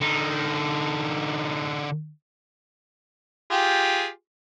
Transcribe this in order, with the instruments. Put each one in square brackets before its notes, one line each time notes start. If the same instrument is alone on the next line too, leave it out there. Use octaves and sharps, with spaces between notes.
[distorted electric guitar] D3 D#4
[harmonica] F4 G4 G#4